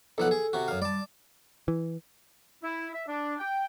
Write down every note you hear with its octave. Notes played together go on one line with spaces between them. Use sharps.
B1 F3 A4 F#5
G#4
C3 F#4
F#2 F5
G3 D5 A5
E3
E4
E5
D4
G5